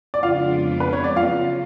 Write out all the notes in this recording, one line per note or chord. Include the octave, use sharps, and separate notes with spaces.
D5
F2 C#3 G#3 B3 D4 F4 F5
B4
C#5
D5
C#3 F#3 C#4 F4 F5